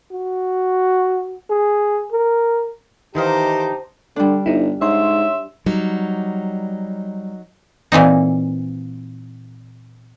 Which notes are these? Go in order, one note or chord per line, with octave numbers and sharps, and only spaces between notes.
F#4
G#4
A#4
D#3 E3 D#4 G4 C5 F5 A5 D6
D3 G3 D4
G1 D#4 E4
G#2 C#5 E5 C6
F#3 G3 D#4
A#2 E3 C4 D#4